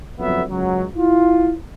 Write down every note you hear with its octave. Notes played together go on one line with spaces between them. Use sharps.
G1 F2 F#3 B3 E5
C#2 F#2 F#3
E4 F4